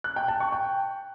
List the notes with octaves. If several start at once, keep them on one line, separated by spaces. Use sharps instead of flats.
F#6
G5
A5
C#6
G5